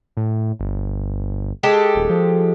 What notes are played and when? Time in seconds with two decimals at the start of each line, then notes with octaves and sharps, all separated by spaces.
0.17 A2
0.59 G1
1.63 G#3 G4 A4
1.95 D#1
2.10 F3